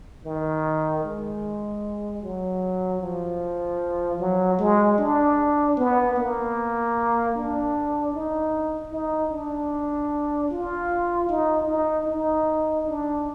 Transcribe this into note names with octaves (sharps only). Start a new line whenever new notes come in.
D#3
G#3
F#3
F3
F#3
G#3
D4
B3
A#3
D4
D#4
D#4
D4
F4
D#4
D#4
D#4
D4